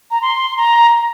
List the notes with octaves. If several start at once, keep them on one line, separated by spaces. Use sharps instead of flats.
A#5
C6
A#5